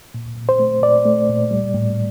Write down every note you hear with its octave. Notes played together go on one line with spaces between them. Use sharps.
A#2
A#2
C5
A3
A#2 D5
A3
A#2
G3
A2